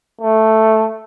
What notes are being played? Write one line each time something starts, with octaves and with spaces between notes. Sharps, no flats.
A3